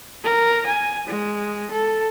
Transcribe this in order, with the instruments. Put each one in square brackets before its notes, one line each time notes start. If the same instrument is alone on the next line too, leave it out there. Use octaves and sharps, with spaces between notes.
[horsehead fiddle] A#4
G#5
G#3
A4